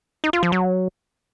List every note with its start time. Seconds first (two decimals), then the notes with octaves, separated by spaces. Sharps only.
0.24 D#4
0.33 F4
0.43 F3
0.52 F#3